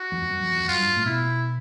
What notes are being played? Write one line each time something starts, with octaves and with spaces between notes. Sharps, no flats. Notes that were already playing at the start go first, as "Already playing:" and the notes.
Already playing: F#4
F2
F2
F#2
F2
F2
F#2 F4
G2
A2
B2 E4